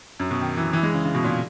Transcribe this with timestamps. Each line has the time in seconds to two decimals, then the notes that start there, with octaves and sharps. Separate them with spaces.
0.20 F#2
0.31 B2
0.41 D#3
0.57 E3
0.73 E3
0.83 G#3
0.94 C#3
1.05 C#3
1.15 B2
1.24 A#2